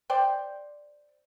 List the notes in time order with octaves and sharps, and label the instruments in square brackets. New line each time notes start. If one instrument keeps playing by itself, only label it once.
[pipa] C5 D5 G5